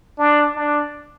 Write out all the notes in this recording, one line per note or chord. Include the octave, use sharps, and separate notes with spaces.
D4
D4